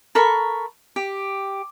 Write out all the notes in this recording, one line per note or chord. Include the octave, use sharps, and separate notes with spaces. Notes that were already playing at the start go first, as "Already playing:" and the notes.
A4 A#4 B5 C#6
G4